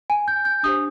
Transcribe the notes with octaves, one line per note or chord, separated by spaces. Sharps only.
G#5
G6
G6
D4 G4 C5 D#6